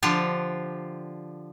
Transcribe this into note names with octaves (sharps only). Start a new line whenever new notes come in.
D3 F3 D4 F4 G4